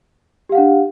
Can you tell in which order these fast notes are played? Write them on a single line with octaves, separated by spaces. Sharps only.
G4 F5 F#5 D4